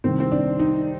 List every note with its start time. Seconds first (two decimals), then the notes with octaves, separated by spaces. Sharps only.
0.04 C2 C3 D#3 C4
0.20 C4
0.32 D4
0.59 D#4